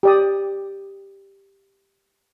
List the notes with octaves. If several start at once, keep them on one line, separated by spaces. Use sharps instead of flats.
G4 D5 D#6